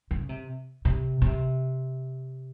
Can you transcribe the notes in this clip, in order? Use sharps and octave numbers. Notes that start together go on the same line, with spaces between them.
C#3
C3
C3
C3